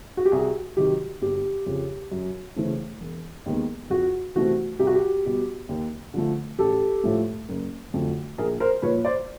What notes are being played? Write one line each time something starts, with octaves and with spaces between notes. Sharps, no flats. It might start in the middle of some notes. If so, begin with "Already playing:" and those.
F#4
G4
C2 F#4 G#4
C3 D#3 F#3 G4
G1 G4
F2 C#3
F#2
C#3 E3 A3 C4
E1
D#2 D#3 G#3 B3
F2 F#4
C3 E3 A3 C4 F#4
C2 G4
F#4
G4
B2 G3
D#2
D3 F3 A3
A1 G4 A4
A2 F3 A3
F#1
F2 D3 F#3 A3
A#1 G#4 A#4
A#4 C5
A#2 F3 B4 C#5
C5 D5